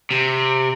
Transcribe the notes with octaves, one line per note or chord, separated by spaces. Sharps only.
C3